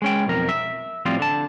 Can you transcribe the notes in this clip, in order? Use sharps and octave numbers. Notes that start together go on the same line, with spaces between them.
G#3 C#4 G5
B1 F2 A#4
E5
A2 F3 G3 C4 F4
D3 A5